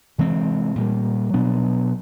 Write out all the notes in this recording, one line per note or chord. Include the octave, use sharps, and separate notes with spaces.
C3 E3 G#3 C4
A#2 G3 A#3
B2 F#3 B3 D4